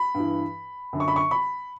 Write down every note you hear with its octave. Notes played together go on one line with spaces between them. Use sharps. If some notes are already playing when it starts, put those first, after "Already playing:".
Already playing: B5
G2 E3
F#2 D3
C#6
B5
C#6
B5